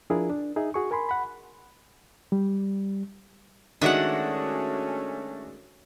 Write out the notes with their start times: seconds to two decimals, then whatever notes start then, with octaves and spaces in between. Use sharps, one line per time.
0.10 F3 D4 E4 F4 G#4 A#4
0.30 D4
0.56 D#4 G#4 E5
0.74 F#4 G#4 C#6
0.91 A#4 G#5 B5 C6
1.09 F#5 B5
2.32 G3
3.81 D#3 G#3 A3 C#4 D4 F#4 E5 F#5